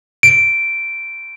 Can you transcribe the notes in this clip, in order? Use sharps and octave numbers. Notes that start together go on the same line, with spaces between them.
D7